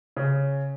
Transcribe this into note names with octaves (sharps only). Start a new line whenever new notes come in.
C#3